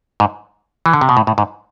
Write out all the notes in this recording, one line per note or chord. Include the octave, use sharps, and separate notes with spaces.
G#2
E3
D3
C3
B2
A2
A2
G#2